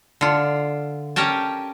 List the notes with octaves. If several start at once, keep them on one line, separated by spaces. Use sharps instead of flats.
D3 F4
C#4 G4 A#4 G5 A5